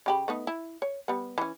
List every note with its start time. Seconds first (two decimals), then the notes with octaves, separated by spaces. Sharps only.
0.06 C#3 G4 B5
0.28 A3 B3 D#4
0.47 E4
0.82 C#5
1.08 G3 B3
1.38 E3 C#4